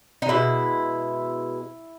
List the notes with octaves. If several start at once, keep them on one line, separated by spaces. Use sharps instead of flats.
D#4
B2 G#3 E4